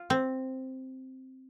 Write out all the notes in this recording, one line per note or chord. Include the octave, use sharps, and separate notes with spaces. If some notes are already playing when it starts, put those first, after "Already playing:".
Already playing: F4
C4